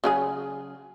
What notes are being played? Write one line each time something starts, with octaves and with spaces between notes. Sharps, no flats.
C#3 F#3 G#4